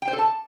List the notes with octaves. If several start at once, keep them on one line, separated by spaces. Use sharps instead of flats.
G5
C5
A4
A5